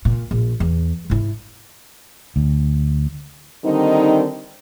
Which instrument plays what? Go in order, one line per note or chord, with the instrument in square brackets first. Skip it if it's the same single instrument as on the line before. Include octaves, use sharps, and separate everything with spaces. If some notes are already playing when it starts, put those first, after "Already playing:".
[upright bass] A#2
A#1
E2
G#2 E4
[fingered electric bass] D2
[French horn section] D3 D#3 G3 C4 D#4